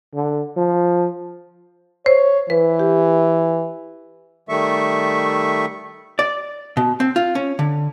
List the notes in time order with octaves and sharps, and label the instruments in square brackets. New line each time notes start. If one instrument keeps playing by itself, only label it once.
[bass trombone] D3
F3
[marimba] C5 [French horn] C#5
[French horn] E3 [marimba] B4
[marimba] G4
[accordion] D#3 G3 A3 E5 C#6
[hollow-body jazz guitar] D5
B2
C4
F4
C#4
D3